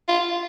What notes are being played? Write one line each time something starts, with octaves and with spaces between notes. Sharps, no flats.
F4